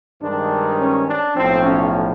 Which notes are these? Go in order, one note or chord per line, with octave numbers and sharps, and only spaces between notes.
G2 D#3 G#3 C4 D4
C#4
D4
B1 A2 F3 C4
C#4